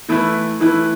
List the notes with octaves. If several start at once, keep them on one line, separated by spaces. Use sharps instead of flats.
E3 A3 E4 B4
E3 A3 E4 B4